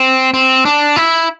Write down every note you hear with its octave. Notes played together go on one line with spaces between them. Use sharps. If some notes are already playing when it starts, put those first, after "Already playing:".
Already playing: C4
C4
D4
E4